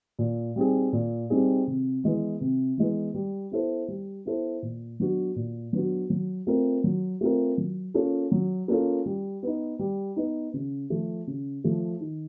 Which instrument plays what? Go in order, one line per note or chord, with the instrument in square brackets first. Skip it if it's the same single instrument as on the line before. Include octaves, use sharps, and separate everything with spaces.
[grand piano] A#2
G3 C4 D#4 G#4
A#2
G3 C4 D#4 G#4
C3
E3 G#3 B3
C3
E3 G#3 B3
G3
B3 E4 A4 C5
G3
B3 E4 A4 C5
A#2
F#3 B3 D4 F#4
A#2
F#3 B3 D4 F#4
F#3
A3 C4 F4 A#4
F#3
A3 C4 F4 A#4
F#3
A#3 C#4 F4 A4
F#3
A#3 C#4 F4 A4
G3
B3 D#4
G3
B3 D#4
C#3
F3 A3
C#3
F3 A3
D#3